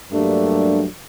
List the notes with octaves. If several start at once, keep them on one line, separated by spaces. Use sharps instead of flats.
G2 F#3 G3 A3 A#3 D4